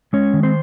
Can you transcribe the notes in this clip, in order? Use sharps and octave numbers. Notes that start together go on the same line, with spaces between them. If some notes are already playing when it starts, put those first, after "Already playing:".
G#3 C#4 C#5
D#3
C4 C5